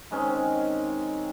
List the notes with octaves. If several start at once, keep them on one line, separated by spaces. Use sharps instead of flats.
D#3 G#3 C4 C#4